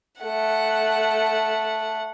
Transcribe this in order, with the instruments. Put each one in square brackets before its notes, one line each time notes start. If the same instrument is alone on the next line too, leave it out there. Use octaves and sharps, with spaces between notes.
[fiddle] A3 F#5